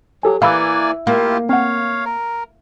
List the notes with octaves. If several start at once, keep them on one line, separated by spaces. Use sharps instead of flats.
F#3 G4 A4 G#5
E3 A#3 D5 F5 G#5 B5 E6
A#3 E4 F4 G4
C4 C#5 F5 F#5
A#4